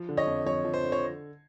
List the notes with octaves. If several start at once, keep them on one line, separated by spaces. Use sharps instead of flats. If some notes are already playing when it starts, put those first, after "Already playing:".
Already playing: F3
D3
C#5 D#5
F2
F2 C#5
F3
C5
D3
C#5